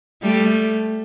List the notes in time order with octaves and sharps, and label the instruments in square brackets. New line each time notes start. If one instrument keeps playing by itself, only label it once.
[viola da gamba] G3 A3